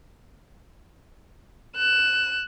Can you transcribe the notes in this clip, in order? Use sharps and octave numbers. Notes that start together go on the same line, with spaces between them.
F#6 E7